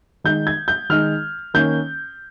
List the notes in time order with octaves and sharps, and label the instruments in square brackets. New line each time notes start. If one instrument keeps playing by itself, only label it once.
[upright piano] D#3 G#3 D#4 G6
G#6
G6
D#3 G#3 D#4 F6
D#3 A#3 C#4 G6